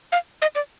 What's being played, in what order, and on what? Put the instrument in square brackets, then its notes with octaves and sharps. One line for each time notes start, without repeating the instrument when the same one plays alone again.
[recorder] F5
D#5
D5